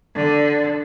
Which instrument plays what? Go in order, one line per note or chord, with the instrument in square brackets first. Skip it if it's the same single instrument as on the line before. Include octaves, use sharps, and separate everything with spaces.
[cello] D3